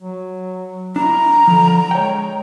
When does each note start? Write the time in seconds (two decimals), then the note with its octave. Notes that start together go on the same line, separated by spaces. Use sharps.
0.02 F#3
0.96 D4 E4 A#5
1.47 D3 F3
1.91 G#3 C#5 G5